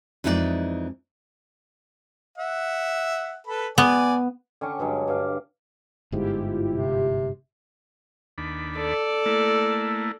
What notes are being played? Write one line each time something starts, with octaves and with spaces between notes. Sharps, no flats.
F2 E3 G#3 D#4 F#4 D5
E5 F#5
A4 B4 B5
B3 D5 G#5
D3 C#4 G5 C#6
G2 D3 F#3 G#3
G2 F5 D6
G1 G#2 E4 F4 G4
C3
D#2 D4 B5
A4 D5
A3 A#3 E4